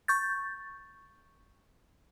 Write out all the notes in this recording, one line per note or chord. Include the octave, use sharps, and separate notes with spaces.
C#6 G6 A6